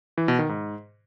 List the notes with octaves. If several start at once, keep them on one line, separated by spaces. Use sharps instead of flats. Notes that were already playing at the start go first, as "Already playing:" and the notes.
E3
B2
D#3
G#2